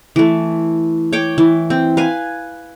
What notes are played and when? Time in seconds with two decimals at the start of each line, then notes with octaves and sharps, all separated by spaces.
0.16 E3 A3
1.13 C#5 G5 D6
1.38 E3
1.70 C4
1.97 B4 F5 G#5